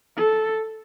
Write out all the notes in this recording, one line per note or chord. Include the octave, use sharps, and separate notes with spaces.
A4